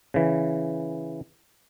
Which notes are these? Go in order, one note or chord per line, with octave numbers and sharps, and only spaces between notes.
C#3 E3